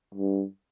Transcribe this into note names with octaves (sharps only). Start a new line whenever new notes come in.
G2